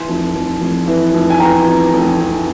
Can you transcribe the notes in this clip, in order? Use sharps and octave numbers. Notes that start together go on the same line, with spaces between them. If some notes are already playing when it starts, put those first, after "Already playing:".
Already playing: E3 G#5 C6
F1
F1
F1
E3
F1
G#5
E2 G5 A#5
F1
F1
F1